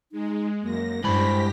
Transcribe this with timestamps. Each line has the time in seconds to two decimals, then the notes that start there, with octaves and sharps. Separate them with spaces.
0.12 G#3 D#4
0.62 F#2 A#3 A#6
1.04 G2 G#3 E4 G4 C5 B5 A#6 B6